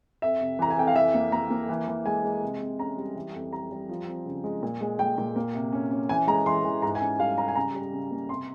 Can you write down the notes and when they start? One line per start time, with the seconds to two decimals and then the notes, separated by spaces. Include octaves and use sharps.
0.22 F2 E5
0.41 C3
0.59 E3 A#5
0.70 G#5
0.77 F2 G5
0.87 F5
0.96 E3 E5
1.14 A#3
1.32 A#3 A#5
1.50 A#3
1.69 E3
1.88 E3
2.05 G#3 G#5
2.24 G#3
2.43 C3
2.61 C3
2.79 C#4 A#5
2.97 G3
3.16 E3
3.34 F2
3.53 G3 A#5
3.70 G3
3.89 F3
4.08 C4
4.26 C#3
4.44 G#3
4.63 A#2
4.81 G#3
4.99 A#2 G5
5.18 A#2
5.36 A#3
5.54 C3
5.73 C#4
5.91 C#4
6.09 E3 G#5
6.27 G#3 A#5
6.46 E3 C6
6.64 E3
6.82 G#2 A#5
6.95 G#5
7.01 C#4
7.19 G3 F5
7.38 G3 A#5
7.48 G#5
7.56 C#3 A#5
7.75 G3
7.93 C#3
8.11 A#3
8.29 C3 C6